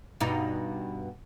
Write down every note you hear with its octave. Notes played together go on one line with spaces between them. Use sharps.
G2 B2 D#4